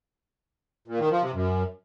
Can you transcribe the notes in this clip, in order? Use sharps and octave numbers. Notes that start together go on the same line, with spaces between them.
A#2
D#3
F3
C3
F#2